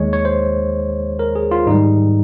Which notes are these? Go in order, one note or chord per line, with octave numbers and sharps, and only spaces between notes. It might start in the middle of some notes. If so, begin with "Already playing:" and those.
Already playing: D#2 D#3 G#3 C#5
C#5
C5
A#4
G#4
F4
G#2 D#3 G3 D#4